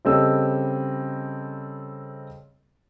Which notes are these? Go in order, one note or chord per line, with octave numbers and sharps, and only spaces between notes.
C#3 G3 C4 A4 D#5 E6